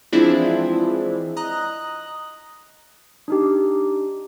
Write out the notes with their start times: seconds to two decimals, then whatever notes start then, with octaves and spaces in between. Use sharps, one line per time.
0.12 E3 F3 G#3 C4 D4 E4
1.37 D#5 A#5 F#6
3.28 D4 D#4 G4